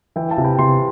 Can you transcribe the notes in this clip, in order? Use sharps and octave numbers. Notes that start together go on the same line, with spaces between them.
E3 E5 G5
F5 A5
C3
G5 B5
C3 C6